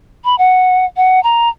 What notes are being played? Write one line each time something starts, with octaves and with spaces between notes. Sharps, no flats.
B5
F#5
F#5
A#5